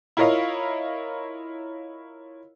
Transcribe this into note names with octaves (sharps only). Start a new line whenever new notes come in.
E4 F4 A#4 C#5 D#5 F5